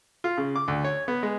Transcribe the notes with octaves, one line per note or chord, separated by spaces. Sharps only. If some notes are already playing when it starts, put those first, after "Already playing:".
F4
C#3
D6
D2
C#5
B3
G#3